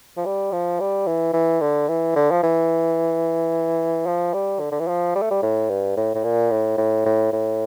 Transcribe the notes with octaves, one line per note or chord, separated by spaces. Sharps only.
F3
G3
F3
G3
E3
E3
D3
E3
D3
F3
E3
F3
G3
D3
D3
E3
F3
G3
A3
G3
A2
G2
A2
A2
A#2
A2
A2
A2
A2